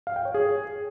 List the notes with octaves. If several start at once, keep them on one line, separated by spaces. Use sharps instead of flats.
F5
G5
C#5
G#4